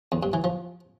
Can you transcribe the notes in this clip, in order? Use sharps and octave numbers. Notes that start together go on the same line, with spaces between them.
E2
G2
E3
F3